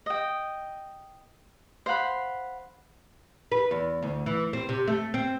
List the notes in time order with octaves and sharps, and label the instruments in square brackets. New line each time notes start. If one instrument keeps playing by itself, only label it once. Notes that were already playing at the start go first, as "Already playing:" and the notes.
[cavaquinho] D#5 G5
C5 F5 F#5 B5
[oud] B4
E2
D2
E3
C4
C3
A3
C4